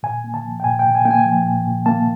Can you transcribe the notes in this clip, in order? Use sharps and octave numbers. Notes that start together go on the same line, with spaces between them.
A#2 G#5
A#3
A5
F3
G5
A#2 G#5
A#2 G5
G#5
A#3 G5
G#5
F3
A#2
A#2
A#3 A5